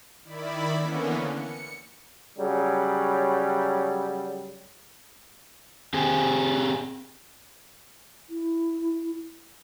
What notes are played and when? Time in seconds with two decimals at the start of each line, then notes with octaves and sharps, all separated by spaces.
0.24 D#3 E4 D5 B5
0.78 D3 E3 A#3 B3 C#4
1.32 C#7
2.37 C#3 F#3 G3
5.94 C4 G4 G#4 G#5
8.30 E4